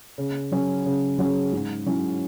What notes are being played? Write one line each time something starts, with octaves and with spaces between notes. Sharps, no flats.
C#3
F#3 C#4 G#4
C#3
F#3 C#4 G#4
G#2
F#3 C#4 E4